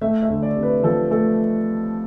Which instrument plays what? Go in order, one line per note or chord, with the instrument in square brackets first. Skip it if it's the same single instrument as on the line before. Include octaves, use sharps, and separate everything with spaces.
[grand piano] A3 E5
E5
D2
D5
C3
B4
F3 A4
A3 A4